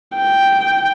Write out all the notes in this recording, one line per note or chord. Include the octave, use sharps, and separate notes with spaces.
G5